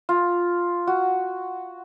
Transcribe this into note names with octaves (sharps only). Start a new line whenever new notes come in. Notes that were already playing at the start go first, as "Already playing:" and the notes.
F4
F#4